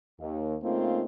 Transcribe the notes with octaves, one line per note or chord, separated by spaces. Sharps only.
D#2
C#3 A3 A#3 C4 D#4 F4